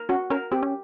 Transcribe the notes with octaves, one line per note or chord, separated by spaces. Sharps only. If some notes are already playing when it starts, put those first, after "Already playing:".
Already playing: A#4
C#4 F#4
C#4 A#4
C4 G4
C#4